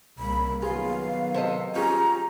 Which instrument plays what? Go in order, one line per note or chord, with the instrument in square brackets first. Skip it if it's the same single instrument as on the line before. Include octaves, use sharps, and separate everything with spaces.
[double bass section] C2 C#3 A#3 [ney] B5
[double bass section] D#3 F#3 B3 [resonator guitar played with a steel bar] F4 [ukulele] G#4 [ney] F5
[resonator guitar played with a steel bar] C3 A4 D#5 [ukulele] C5
[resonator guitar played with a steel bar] G3 C#4 G4 [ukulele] F4 G#4 [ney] A#5